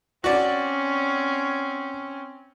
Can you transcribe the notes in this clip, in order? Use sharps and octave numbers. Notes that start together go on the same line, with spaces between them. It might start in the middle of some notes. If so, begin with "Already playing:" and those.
C4 C#4 F#4 D5